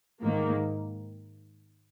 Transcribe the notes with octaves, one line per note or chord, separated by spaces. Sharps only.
G#2 D#3 A#3